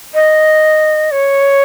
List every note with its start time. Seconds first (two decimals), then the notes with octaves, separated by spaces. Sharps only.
0.14 D#5
1.11 C#5